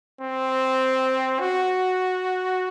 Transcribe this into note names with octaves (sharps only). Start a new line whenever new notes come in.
C4
F#4